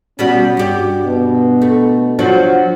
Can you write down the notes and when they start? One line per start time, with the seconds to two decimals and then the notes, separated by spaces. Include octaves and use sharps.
0.19 B2 G3 B3 C#4
0.57 G2 F#4 G4
1.06 B2
1.62 A3
2.19 F3 F#3 D4